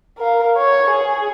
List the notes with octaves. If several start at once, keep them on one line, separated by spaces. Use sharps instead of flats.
A#4 F5
C#5
G#4